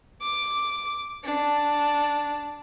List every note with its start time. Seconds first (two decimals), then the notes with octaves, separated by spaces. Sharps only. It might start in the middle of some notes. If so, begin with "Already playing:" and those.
0.22 D6
1.25 D4